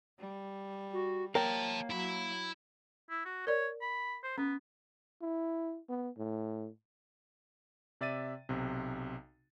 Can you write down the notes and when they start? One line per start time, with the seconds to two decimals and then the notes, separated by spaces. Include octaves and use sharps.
0.19 G3
0.93 F#4
1.35 A#3 A#4 C#5 F5 G5 A5
1.90 F#3 E4 B5
3.10 E4
3.25 F#4
3.47 A#4 C#5 D5
3.82 B5
4.23 C5
4.38 B3 C#4
5.22 E4
5.89 B3
6.18 A2
8.01 C3 D5 E5 A6 D#7
8.49 B1 C3